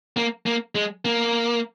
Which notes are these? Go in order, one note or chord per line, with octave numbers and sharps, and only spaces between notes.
A#3
A#3
G#3
A#3